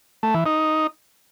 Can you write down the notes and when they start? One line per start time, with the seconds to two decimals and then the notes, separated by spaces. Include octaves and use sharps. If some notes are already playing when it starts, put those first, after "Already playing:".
0.23 A3
0.34 E3
0.46 D#4